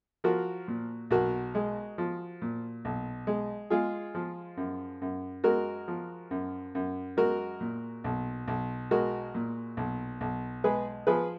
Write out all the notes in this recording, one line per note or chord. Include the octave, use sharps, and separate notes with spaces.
F3 F#4 A#4
A#2
B1 F#4 A#4
G#3
F3
A#2
B1
G#3
G#3 F4 G#4
F3
F#2
F#2
G#3 F#4 A#4
F3
F#2
F#2
G#3 F#4 A#4
A#2
B1
B1
G#3 F#4 A#4
A#2
B1
B1
G#3 G#4 B4
F3 G#4 B4